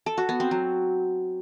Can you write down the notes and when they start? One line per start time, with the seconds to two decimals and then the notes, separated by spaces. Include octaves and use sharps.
0.06 A4
0.18 F#4
0.29 B3
0.40 C4
0.51 F#3